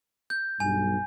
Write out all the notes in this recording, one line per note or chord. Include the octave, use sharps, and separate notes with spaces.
G6
B1 G2 G#5